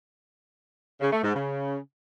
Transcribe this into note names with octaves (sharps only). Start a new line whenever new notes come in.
C#3
A3
G#2
C#3